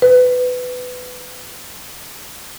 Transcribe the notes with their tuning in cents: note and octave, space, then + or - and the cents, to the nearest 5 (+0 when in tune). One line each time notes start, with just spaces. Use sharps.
B4 +15